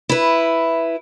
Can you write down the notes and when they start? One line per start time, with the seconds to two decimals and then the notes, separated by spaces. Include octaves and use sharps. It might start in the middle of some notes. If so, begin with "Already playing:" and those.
0.09 E4 B4